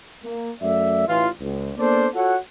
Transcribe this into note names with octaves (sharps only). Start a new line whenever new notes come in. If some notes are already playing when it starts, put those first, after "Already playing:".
A#3
F#2 A3 D5 E5
A1 E3 F4
C#2
A#3 B3 D4 A4 C5 D5
F4 F#4 A4 C#5 F#5